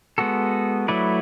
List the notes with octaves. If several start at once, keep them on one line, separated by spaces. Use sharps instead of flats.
G#3 B3 F#4 A4
F#3 A3 E4 B4 D5